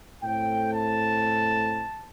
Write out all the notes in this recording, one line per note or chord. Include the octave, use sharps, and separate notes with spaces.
A2 A3 C4 G5
A5